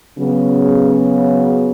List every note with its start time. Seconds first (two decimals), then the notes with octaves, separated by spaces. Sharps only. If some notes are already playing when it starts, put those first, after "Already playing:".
0.19 C#3 F#3 B3